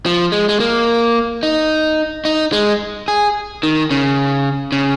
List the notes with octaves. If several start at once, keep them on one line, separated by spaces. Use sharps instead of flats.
F3
G#3
G#3
A#3
D#4
D#4
G#3
G#4
D#3
C#3
C#3